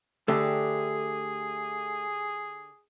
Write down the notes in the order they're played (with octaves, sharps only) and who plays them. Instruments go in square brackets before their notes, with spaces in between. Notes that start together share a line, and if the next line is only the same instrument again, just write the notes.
[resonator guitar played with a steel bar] D3 G4 [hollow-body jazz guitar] A3 [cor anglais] G#4